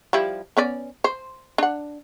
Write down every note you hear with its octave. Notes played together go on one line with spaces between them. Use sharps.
F3 G3 E4
B3 C#4 D5
C5
D4 F#5